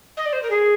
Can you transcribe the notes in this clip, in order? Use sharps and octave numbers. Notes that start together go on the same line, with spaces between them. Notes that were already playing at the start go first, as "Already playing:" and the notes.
D#5
D5
C5
A#4
G#4